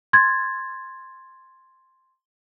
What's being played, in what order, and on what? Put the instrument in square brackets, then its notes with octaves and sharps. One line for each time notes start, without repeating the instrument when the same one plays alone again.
[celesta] C6 G#6 A6